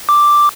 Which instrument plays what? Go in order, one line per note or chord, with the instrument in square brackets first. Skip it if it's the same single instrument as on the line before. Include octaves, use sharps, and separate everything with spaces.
[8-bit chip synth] D6